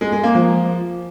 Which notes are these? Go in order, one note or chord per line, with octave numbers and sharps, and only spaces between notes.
G#3
G#3
A#3
F3